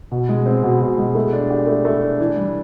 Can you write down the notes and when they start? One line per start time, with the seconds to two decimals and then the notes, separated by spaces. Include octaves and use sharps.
0.11 B2
0.29 G#3
0.46 C4
0.63 B2
0.81 B2
0.98 G#3
1.15 A3
1.33 D4
1.50 G4
1.67 A3
1.85 A3
2.02 D4
2.20 E3
2.37 G3